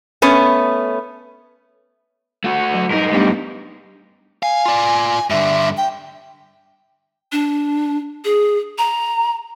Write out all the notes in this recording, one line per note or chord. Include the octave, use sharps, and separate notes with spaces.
A3 B3 C#4
A3 F#4
F#3
G2 D#4 A#4
G3 A3 B3 D4
F5 G#5
F4 D5
G2 D3 E5
G5
D4
G#4
A#5